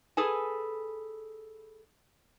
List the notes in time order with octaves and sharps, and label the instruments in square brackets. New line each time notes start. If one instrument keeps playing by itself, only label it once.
[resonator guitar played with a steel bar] G#4 A4 B4 G#5